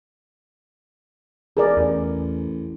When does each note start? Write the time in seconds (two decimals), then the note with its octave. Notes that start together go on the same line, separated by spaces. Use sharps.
1.57 E1 G#4 A#4 D5
1.77 A1 E2